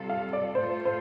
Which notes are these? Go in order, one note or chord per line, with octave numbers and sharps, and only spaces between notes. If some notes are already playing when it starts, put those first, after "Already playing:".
Already playing: C3 G3 F4 A4
F5
D5
A2 A3 F4 A4 C5
C5